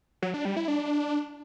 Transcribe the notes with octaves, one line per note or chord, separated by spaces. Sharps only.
F#3
D4
G3
E4
D4